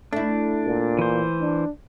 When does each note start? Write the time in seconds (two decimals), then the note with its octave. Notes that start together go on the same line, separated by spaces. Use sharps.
0.13 A3 D4 E4
0.66 A#2
0.99 E3 C5
1.41 D4